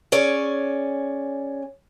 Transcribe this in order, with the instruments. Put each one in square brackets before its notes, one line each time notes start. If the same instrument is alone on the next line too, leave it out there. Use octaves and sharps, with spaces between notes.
[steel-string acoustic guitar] C#4 G#4 C#5 D5